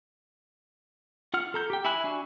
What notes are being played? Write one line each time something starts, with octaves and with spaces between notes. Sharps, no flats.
F4 F#5 F6
A4 A#5 G6
G4 G5
E4 E5 G#5 B5 F#6
D4 F#4 G#5